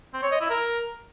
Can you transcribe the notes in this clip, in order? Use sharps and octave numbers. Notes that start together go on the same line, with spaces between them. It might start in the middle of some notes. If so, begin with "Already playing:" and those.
C4
C#5
D#5
E4
A#4